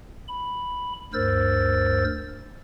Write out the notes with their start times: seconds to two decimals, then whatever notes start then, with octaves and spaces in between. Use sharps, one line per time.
0.28 B5
1.14 D2 G2 A#4 C5 E6 A6